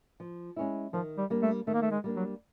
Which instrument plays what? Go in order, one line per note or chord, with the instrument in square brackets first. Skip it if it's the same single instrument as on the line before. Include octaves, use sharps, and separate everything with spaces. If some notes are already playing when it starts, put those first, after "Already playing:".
[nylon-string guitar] F3
G#3 C#4 E4
[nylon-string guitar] D#3 [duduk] F3
[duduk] G3
[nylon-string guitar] G3 A#3 D4
[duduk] A3
[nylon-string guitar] D#3 [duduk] A3
[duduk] A#3
A3
G#3
[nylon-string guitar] G3 A#3 D4
[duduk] F#3